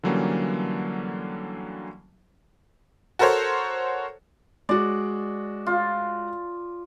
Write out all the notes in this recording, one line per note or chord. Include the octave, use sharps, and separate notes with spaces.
D3 E3 F#3 G3 A#3 C#4
F#4 A4 A#4 C5 C#5
G#3 F#4 D5
F4